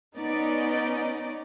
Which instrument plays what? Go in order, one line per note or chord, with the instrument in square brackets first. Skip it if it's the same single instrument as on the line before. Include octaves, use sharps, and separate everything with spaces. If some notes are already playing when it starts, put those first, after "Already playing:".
[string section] B3 C#4 D#4 D5 D#5